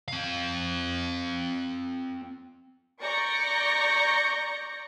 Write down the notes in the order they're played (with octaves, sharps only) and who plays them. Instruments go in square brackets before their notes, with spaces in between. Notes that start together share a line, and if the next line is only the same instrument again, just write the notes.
[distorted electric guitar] C4 F5
[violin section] D5 A#5 C#6 G6 A#6 C#7